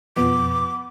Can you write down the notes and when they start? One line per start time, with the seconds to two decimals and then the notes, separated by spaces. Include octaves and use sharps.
0.16 F2 B2 F3 B3 D6